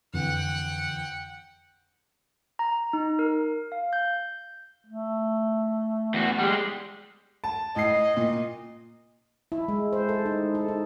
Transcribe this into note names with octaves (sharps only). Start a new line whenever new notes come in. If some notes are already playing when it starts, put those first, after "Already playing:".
F2 D3 E3 F#5 G5
A#5
D#4
A#4
F5
G6
A3
E2 F#4
G3 G#3 G4
A5
A2 D#5 C7
A#2
E4
G#3
C5
A4
D#4
A4
D#4